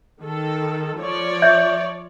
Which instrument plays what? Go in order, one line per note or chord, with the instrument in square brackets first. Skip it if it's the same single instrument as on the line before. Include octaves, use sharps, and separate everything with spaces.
[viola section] D#3 A4
F3 C#5 D5
[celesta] E5 G6 G#6